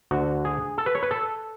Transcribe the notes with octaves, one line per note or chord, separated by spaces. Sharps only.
D2 D3 F#4
G#4
A4
B4
C#5
B4
A4